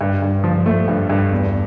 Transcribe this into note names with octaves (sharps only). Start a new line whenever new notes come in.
G2
G2
F3
A3
G2
G2
E2